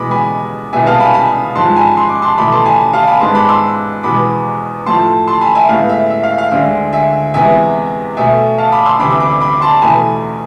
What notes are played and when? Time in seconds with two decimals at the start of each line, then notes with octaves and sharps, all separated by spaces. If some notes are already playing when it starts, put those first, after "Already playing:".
Already playing: E2 B2 G#3 B3 B5 D6
0.11 G#5 B5
0.73 C2 B2 G#3 B3 E5 G#5
0.86 F5 A5
1.00 G#5 B5
1.14 G#5 B5
1.55 G#2 F3 G#3 A5 C6
1.76 G#5 B5
1.97 C6
2.09 D6
2.22 A5 C6
2.38 E2 B2 A3 B5 D6
2.52 A5 C6
2.65 G#5 B5
2.93 F5 A5
3.07 G#5 B5
3.20 G#2 G#3 B3 A5 C6
3.35 B5 D6
3.48 C6 E6
4.03 E2 B2 G#3 B3 B5 D6
4.86 A2 F3 A3 A5 C6
5.28 A5 C6
5.41 G#5 B5
5.55 E5 G#5
5.69 A2 G#3 B3 F5
5.89 E5
6.10 E5
6.23 F5
6.38 F5
6.51 D2 D3 G#3 E5
6.93 E5 G#5
7.34 E2 C3 G#3 B3 E5 G#5
8.17 B2 A3 E5 G#5
8.58 F5 A5
8.72 B5 D6
8.86 C6 E6
8.99 D2 C3 E3 B5 D6
9.11 E6
9.20 B5 D6
9.40 B5 D6
9.55 D6
9.61 A5 C6
9.82 E2 B2 A3 G#5 B5